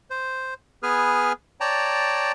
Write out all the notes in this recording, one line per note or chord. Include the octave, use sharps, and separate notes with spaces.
C5
B3 G#4 B4 G#5 F6
C#5 D5 G5 A5 A#5